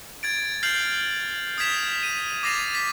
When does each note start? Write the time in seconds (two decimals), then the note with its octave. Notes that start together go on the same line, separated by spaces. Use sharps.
0.23 G#6 A6 D7
0.63 F6 G6 A6 C7 F7 F#7
1.58 D#6 F6 G#6 B6 E7 F7
2.03 D#7
2.43 D6 A6 A#6 C7 D#7 F7
2.75 A6 B6 F7